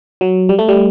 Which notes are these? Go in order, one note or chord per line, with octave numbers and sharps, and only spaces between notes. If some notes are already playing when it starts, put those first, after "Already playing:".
F#3
G3
A3
G3